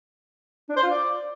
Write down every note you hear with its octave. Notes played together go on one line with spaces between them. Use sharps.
D4
C5
F4
D5